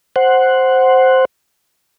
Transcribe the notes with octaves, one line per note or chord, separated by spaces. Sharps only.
C5 F#5